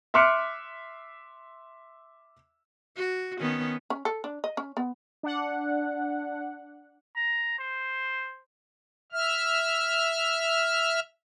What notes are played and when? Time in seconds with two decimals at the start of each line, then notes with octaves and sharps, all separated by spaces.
0.14 E5 C6 D6 F6 F#6 C#7
2.97 F#4
3.40 D#3 B3 C#4
3.90 C#4
4.05 A4
4.24 D4
4.44 D#5
4.57 C#4
4.77 B3
5.23 D4 F#5
7.16 A#5
7.59 C5
9.12 E5 F6